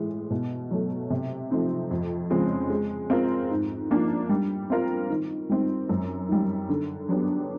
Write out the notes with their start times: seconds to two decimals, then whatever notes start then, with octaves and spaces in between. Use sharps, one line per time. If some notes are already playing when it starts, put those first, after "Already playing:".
Already playing: A2 E3 G#3
0.31 B2
0.71 F#3 A3
1.10 C3
1.50 F3 A3 C4 D#4
1.91 F2
2.30 C#3 F3 G#3 C4
2.70 G#3
3.10 C4 F4 A#4
3.50 G#2
3.90 F3 A#3 D4
4.29 G3
4.70 C4 F4 A#4
5.10 D#3
5.50 G3 C4
5.89 F#2
6.29 D#3 G3
6.69 D3
7.09 F#3 B3 D4 G4